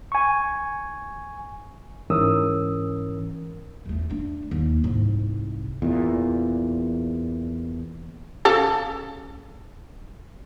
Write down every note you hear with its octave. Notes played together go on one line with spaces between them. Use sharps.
G#5 C#6
G#2 E3 C#4 A#4 D#6 E6
E2 A3
A3 D4
D#2
C2 G#2
E2 A#2
C#3 A4